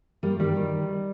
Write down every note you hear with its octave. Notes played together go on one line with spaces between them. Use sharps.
G2 G3 A#3
D#3 G3
D#3